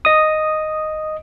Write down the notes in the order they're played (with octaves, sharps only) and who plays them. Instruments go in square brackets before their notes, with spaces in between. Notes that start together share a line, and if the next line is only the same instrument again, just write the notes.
[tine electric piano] D#5 D#6